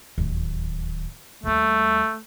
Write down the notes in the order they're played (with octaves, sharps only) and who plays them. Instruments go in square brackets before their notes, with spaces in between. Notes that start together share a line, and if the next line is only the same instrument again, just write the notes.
[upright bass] D1 D#2
[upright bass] D#2 G3 [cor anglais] A3